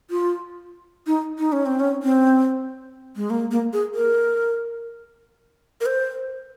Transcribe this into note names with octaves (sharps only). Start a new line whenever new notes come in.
F4
D#4
D#4
C#4
C4
C#4
C4
G#3
A#3
A#3
G#4
A#4
A#4
C5